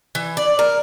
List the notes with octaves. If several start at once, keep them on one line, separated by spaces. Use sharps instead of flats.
E3
D5
A#4